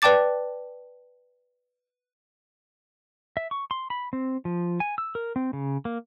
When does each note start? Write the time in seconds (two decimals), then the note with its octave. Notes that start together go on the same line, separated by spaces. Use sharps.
0.02 B4 D5 G5 A5 D6 A6
3.37 E5
3.51 C#6
3.71 C6
3.90 B5
4.13 C4
4.45 F3
4.80 G#5
4.98 E6
5.15 A#4
5.36 C4
5.53 C#3
5.85 A#3